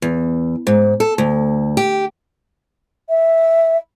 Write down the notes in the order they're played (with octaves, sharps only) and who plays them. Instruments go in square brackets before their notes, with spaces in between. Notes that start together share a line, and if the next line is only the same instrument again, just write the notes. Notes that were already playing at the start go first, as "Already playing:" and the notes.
[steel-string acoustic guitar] E2
G#2
A4
D2
G4
[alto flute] E5